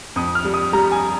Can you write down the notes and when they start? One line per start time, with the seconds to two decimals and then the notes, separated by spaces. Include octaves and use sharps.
0.16 F2 D#6
0.35 F6
0.45 G3
0.54 D#6
0.73 G3 A#5
0.92 G#5